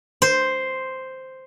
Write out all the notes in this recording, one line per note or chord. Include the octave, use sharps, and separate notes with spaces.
C5